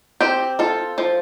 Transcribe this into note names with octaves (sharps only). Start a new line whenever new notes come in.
C4 G4
F4 A4
F3